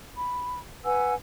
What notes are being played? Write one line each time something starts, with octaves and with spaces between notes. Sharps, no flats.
B5
B4 F#5 G#5 E6